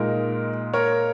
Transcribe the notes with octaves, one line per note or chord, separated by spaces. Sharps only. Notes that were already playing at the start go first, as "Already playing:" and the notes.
Already playing: A#2 G#3 D#4 A#4
A#4 C#5